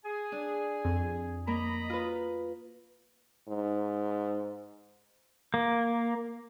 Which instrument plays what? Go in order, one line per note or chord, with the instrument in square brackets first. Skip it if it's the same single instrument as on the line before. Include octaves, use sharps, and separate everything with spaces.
[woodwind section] G#4 G#5
[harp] D4
[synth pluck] F2
[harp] A#3 [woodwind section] D#5 A#5 B5
[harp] F4 B4
[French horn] G#2
[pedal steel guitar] A#3